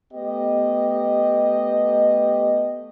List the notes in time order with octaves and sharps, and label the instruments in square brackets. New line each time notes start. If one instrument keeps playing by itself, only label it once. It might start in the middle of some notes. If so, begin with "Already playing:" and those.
[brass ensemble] A3 B3 G4 D#5